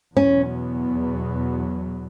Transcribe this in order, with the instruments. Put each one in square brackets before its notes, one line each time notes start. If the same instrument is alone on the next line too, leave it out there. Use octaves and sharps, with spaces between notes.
[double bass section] E2 B2 F#3 B3 [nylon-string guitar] C#4